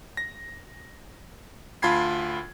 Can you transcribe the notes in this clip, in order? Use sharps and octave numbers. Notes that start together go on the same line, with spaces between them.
A#6
D2 F4 A5 B5 G#6 C7